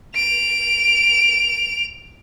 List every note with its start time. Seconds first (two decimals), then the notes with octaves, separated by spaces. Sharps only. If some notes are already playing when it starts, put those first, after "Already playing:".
0.15 D7 F7